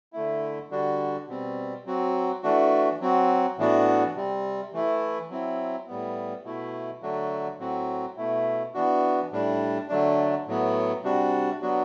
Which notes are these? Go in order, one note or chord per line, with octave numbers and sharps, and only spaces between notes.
D3 A3 E4
D3 G3 D4 F#4
B2 G3 C4
F#3 C4 F#4
E3 A3 D4 F#4
F#3 C4 F#4
A2 E3 B3 D4 F#4
C3 G3 C4
E3 A3 E4
F#3 C4 E4
A2 G3 B3
B2 A3 E4
D3 F#3 A3 D4 F#4
A2 F#3 C4 F#4
B2 A3 E4
E3 B3 D4 F#4
A2 G3 D4
D3 F#3 A3 D4
A2 F#3 B3
C3 G3 D4 F#4
F#3 B3 D4 F#4